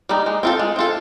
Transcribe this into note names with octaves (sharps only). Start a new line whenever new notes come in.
G3 A#3 D#4
G#3
C4 F4 A4
G#3
C4 F4 A4